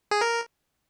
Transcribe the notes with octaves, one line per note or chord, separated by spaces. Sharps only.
G#4
A#4